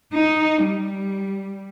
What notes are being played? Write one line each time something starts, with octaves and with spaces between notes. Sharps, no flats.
D#4
G3